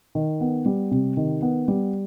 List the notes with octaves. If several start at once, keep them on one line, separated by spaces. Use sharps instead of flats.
D#3
B3
G3
C3
D#3
B3
G3